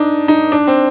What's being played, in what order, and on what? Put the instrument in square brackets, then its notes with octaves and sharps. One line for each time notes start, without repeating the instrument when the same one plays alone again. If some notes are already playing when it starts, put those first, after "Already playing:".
Already playing: [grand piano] D4 D#4
D#4
D4
C4